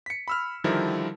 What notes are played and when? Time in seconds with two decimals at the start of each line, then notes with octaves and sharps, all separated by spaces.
0.06 B6 C#7
0.28 B5 E6 F6
0.64 D3 D#3 F3 G3 E4 A#4